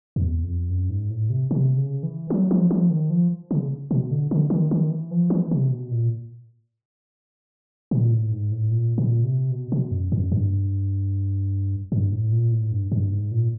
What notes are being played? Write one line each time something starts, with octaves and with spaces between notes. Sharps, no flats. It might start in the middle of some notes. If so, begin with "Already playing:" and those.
E2
F2
F#2
G#2
A2
C3
C3
C#3
E3
F#3
F3
F3
D#3
F3
C#3
B2
D3
D3
D#3
D#3
E3
F3
E3
C3
B2
A#2
A#2
A2
G#2
A2
A#2
A#2
C3
B2
B2
F#2
F#2
G2
G2
A2
A#2
A2
G2
G2
G#2
A#2